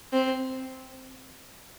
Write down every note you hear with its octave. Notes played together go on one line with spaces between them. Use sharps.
C4